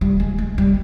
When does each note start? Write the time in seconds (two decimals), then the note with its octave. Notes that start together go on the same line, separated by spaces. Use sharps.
0.01 G3
0.20 G#3
0.38 G#3
0.58 G3